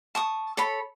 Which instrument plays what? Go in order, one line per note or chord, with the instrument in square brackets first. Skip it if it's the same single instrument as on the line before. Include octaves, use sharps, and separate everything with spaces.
[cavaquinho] A5 C#6 D#6
A4 C#5 B5